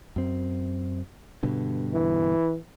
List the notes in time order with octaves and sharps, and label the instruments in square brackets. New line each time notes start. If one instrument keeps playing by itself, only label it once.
[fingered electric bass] F#2 C4
G2 B2 D3
[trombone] E3